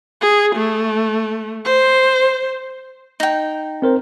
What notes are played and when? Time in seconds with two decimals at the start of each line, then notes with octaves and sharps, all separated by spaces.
0.21 G#4
0.55 A3
1.65 C5
3.20 D#4 G5
3.82 C4 A#4 C5